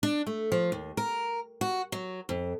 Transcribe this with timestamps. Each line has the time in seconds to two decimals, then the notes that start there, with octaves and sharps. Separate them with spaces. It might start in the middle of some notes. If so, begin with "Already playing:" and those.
0.03 D4
0.27 A3
0.52 F3
0.72 D#2
0.97 A#4
1.61 F#4
1.92 F#3
2.29 F2